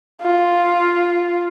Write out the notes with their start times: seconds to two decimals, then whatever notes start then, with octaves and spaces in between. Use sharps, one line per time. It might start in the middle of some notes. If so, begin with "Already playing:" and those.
0.22 F4